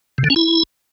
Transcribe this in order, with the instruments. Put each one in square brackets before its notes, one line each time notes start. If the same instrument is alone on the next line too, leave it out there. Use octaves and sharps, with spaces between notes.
[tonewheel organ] C3
D3
C#4
E4